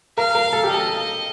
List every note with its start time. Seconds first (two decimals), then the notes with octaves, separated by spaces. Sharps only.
0.18 A#4 F5
0.35 A#4
0.53 A4
0.64 G4
0.71 A4 D#5